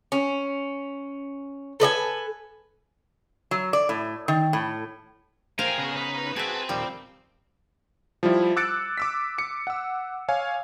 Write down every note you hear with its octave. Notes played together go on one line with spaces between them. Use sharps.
C#4
A4 B4 D#5 G#5
F#3
D5
A2
D#3
A2
A3 G#4 A#4 C5 F5 G5 G#5
C#3 B3 F#4 B4
D#4 B4
C4 F#4 G#4 E5 G#5 A5
D#2 A#2 F3 G3 G4
F3 G3 E4
D6 E6 F#6 A6 C#7 D7
D6 E6 B6
D6 C#7
F#5 E6
C#5 F5 G#5